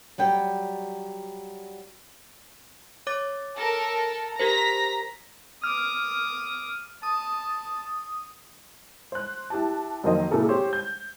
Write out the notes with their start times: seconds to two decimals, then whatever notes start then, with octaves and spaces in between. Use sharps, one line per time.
0.18 F#3 G3 G5
3.07 C#5 D6 A6
3.58 A4 A#4
4.40 G4 A#4 C5 A#5 A#6 B6
5.64 D6 D#6 F6
7.03 A5 D#6
9.12 C5 F#6
9.50 E4 G4 A5
10.04 F2 D#3 F#3 A#3 C5 D#5
10.31 A#2 C#3 E4 A4 A#4
10.49 C4 G4 C5 C#5
10.73 G6